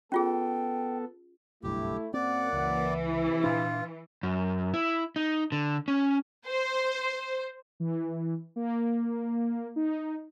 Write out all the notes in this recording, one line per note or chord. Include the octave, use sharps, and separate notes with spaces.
B3 C#4 F4 G#4 A4 G5
F#1 B1 G2 A3 E4 G4
F#2 A#3 C4 D5 F#5
C#2 E3
C3 E4
A#2 D4 F4
F#2
E4
D#4
D3
C#4
C5
E3
A#3
D#4